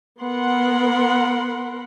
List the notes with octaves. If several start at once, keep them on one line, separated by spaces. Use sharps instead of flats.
B3 A#4 F#5 B5 C6